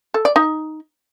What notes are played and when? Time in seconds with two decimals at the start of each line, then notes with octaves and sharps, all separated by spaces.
0.14 A4
0.25 D5
0.36 D#4